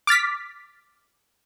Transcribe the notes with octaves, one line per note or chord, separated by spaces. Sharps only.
D6 F6 A6 B6